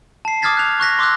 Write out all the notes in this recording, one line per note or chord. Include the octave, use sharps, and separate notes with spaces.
A5 C7
D6 D#6 F6 G#6 A6 B6
F#6 F7
C#6 F#6 A#6 B6
C6 D6 E6 F#6